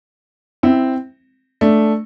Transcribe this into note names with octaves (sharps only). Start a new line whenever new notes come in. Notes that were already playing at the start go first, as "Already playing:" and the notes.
C4 E4
A3 D4